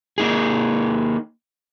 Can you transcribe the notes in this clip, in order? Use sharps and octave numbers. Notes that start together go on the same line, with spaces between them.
A#3 D#4 G#4